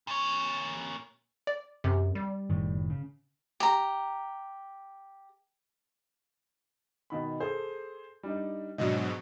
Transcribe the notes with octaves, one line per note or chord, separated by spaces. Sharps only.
A#2 C#5
D5
F#2 C3
G3
F#1 A2 D#3
C#3
G4 A#5
B2 D#3 B5
G#4 A4 C5
G3 D4 D#4
G#2 B2 F#3 D4 D#5